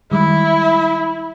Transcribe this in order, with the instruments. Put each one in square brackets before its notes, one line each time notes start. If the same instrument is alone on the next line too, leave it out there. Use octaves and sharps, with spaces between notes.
[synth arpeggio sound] D#3 G3 G#3 [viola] E4